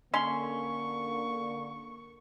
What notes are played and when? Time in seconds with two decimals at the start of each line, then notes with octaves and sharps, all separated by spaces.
0.14 D3 A#3 C#4 C6 C#6